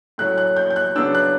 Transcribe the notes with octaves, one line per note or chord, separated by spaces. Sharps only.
A2 F#3 C#4 F#6
F#6
G6
G6
F#6
C#3 F#3 B3 D4 E6
F#6